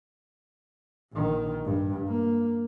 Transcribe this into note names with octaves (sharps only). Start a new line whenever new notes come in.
A#1 D#3
G2
A#3